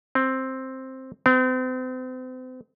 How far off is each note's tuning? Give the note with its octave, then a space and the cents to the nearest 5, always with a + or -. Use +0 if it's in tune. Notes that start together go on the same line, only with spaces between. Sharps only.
C4 +5
C4 -40